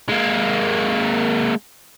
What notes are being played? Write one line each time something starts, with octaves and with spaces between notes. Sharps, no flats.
G#3 A#3